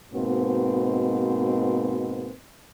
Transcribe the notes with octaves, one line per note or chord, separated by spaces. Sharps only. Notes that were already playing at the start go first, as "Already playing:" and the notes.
G#2 B2 A#3 C4 F#4 B4